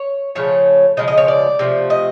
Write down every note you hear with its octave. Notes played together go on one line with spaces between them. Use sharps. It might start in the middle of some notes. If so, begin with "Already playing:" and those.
Already playing: C#5
C#3 F3 A3 C#5
C#3 F3 G#3 D#5
D#5
C#5
D5
C3 F3 A3
D#5